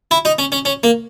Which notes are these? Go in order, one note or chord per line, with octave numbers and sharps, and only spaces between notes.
E4
D#4
C#4
C#4
C#4
A#3